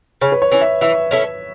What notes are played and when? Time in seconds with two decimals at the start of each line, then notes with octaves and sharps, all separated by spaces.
0.21 C#3 C#5
0.32 B4
0.42 C#5
0.52 E3 C#4
0.61 E5
0.81 E3 E5
1.11 C#4 E4 A4